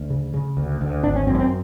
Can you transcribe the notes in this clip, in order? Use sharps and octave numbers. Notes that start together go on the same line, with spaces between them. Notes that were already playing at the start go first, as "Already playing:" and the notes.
Already playing: D2
C#3
C#3
D2
D2
G#1 D4
C#4
F#2 C4
C#4
C4